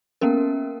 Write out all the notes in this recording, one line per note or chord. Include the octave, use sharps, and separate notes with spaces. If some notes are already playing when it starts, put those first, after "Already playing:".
A#3 B3 C#4 A#4